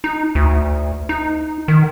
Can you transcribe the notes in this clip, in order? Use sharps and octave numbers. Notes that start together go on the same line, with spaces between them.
D#4
D2
D#4
D#3